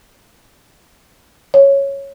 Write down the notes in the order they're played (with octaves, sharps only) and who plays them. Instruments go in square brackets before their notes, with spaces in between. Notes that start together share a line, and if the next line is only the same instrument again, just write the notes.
[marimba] C#5